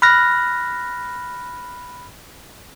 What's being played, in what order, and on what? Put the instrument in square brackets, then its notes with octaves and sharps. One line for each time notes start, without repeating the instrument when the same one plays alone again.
[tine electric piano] B5 F6 F#6 A#6